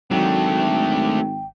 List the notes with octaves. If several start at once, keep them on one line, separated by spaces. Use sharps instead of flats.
G#1 F#3 A3 D4 G5